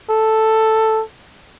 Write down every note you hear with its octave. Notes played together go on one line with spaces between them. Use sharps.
A4